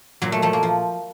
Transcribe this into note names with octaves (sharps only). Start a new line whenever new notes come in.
A#2 F#3
A3
F3 A3
A#3
F3